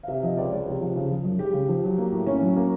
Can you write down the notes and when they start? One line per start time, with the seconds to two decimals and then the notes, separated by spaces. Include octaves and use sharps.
0.03 F5
0.08 C3 E5
0.23 F3 D#5
0.37 C#2 D5
0.52 G#3 C#5
0.66 C3
0.81 F3
0.96 C#3
1.10 F3
1.24 F#2
1.39 G#3 G4
1.53 C#3
1.68 F3
1.84 F#3
1.98 A#3
2.12 A2
2.27 C#4
2.41 F#3
2.56 A#3